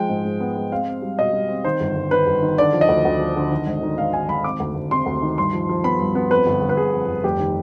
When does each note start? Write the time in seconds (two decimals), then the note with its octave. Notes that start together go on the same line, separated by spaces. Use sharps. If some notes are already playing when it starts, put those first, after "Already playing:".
Already playing: F3 G#3 G5
0.09 G#2
0.25 G#2
0.40 B3
0.56 G#3
0.72 C4 F5
0.87 C4
1.02 G3
1.19 B2 D#5
1.33 G3
1.49 C4
1.64 D#3 C5
1.80 G1
1.96 G1
2.11 D#3 B4
2.27 G1
2.42 D#3
2.58 D3 D5
2.73 F3
2.81 D#5
2.88 D2
3.05 D2
3.20 F3
3.36 D3
3.51 D#3
3.66 G#1
3.83 D#3
3.97 G#2 F5
4.13 D#3 G#5
4.29 G#1 B5
4.44 C3 D6
4.60 D2
4.76 D2
4.91 C3 C6
5.06 D2
5.22 D#3
5.38 G2 C6
5.53 F3
5.69 F3
5.84 B3 B5
5.99 G2
6.15 B3
6.30 F2 B4
6.47 G1
6.61 G1
6.69 B4
6.77 G1 G#4
6.93 F2
7.09 G1
7.24 F1 G4
7.40 D#3